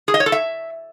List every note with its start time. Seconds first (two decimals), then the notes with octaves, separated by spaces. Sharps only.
0.08 G#4
0.14 D#5
0.20 C#5
0.26 A4
0.32 E5